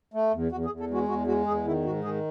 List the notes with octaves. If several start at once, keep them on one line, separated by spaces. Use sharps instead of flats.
A3
E2
E2 F#4
G#4
E2
A4
G#3 F#4
E2 F#4
G#3 F#4
E2 G#4
D#3 E4
G#2 F#4
D#3 G#4